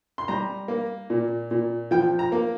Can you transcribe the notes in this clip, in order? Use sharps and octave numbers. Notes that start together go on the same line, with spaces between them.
C6
G3 A#5
A#3
A#2
A#2
F3 G5
A#5
A#3